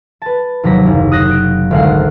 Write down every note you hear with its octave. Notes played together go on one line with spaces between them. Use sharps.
B4 A5
D#2 C3 F#3 A#5 B6
F#1
D#6 F#6 A#6 C7 E7
D7
G#1 D2 G#3 F5 F#5 C7